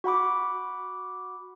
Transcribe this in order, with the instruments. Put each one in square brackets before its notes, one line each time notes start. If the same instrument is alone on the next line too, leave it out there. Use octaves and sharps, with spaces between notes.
[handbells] F#4 F#5 B5 D6